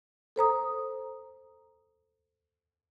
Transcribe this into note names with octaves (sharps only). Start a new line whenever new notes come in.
A4 C5 A#5 D#6